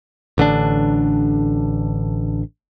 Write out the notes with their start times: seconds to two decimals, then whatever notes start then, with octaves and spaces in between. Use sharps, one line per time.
0.38 A1 D3 D#3 D4